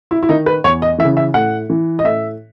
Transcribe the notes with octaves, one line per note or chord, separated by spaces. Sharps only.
E4
E4
D#3 D#4
B4
E2 C#5
D#5
E3 E5
C#3
E5
A2 F#5
E3
D#5
A2 E5